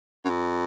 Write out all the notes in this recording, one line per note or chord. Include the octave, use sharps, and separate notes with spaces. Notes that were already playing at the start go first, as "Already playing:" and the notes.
F#2
F2